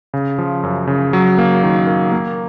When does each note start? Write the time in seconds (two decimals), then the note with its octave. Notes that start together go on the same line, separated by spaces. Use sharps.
0.14 C#3
0.38 F3
0.63 F#2
0.87 C#3
1.13 F#3
1.38 A#3
1.63 D#3
1.87 A#3
2.12 A#3